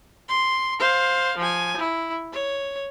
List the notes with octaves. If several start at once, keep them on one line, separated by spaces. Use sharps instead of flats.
C6
C5 F5
F3 G#5
E4
C#5